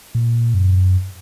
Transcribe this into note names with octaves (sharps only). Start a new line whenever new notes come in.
A#2
F#2